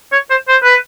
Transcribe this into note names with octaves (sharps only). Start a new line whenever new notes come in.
C#5
C5
C5
B4